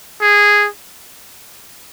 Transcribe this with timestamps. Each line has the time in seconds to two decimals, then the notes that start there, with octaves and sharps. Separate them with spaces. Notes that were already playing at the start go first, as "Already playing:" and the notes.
0.21 G#4